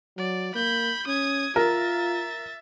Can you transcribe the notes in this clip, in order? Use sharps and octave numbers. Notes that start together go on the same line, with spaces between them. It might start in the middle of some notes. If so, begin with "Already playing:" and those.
F#3 D5
A#3 B5 G6
C#4 D#6 G#6
F4 A#4 E5 A6